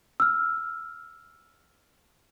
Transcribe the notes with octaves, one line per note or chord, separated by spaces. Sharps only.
E6 F6